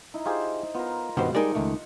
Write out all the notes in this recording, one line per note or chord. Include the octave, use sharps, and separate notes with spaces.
D#4 E4
F4 G4 G#4 C5
B3 F4 A#4
G2 B2 D#3 G3 B3 C5 F#5
G3 G#3 D#4 G#4 A#4 D5
C#2 D#3 A3